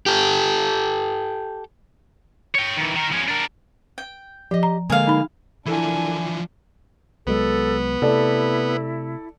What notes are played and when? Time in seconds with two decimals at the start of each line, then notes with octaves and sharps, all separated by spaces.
0.06 G4 A4
2.55 C#5 G5
2.77 D#3 E3
2.96 D#3 A#4
3.12 F3 C#4
3.29 D4 A#4
3.98 G5
4.51 F3 G4 D#5
4.63 A#5
4.90 D3 G#3 A#3 G#4 F5
5.07 D#4 B5
5.66 E3 F3 D4 E4 A4 A#4 G#5
7.27 C2 F#3 G#3 B3 A4
8.02 C3 A3 E4 A4 D5